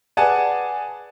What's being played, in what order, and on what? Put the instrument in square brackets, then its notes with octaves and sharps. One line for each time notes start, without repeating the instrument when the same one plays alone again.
[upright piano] G#4 B4 D5 F#5 G#5 A5